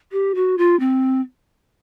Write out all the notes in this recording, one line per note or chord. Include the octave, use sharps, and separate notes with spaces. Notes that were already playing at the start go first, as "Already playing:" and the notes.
G4
F#4
F4
C4